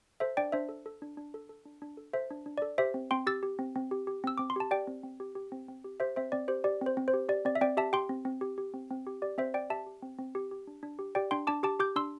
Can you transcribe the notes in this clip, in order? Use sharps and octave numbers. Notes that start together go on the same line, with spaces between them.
A4 C5 E5
D4 D5 G5
D4 C5 E5
A4
A4
D4
D4
A4
A4
D4
D4
A4
A4 C5 E5
D4
D4
A4 D5
G4 C5 E5
C4
C4 G5 C6
G4 E6 A6
G4
C4
C4
G4
G4
C4 E6
C4 D6
C6
G4 A5
G4 D5 G5
C4
C4
G4
G4
C4
C4
G4
G4 C5 E5
C4 C5 E5
C4 D5
G4 C5
G4 D5
C4 C5
C4
C5
G4
G4 D5
C4 D5
E5
C4 D5 G5
G4 E5 A5
G4 G5 C6
C4
C4
G4
G4
C4
C4
G4
G4 D5
C4 C5 E5
C4 D5 G5
G4 E5 A5
G4
C4
C4
G4
G4
D4
D4
G4
G4 D5 G5
D4 G5 C6
D4 A5 D6
G4 A5 D6
G4 D6 G6
D4 C6 E6